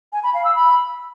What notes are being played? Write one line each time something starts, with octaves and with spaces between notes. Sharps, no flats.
G#5
B5
F5
E6
B5